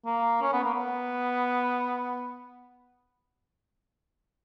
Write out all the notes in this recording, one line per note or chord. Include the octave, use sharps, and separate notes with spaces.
A#3
C#4
B3
A#3
B3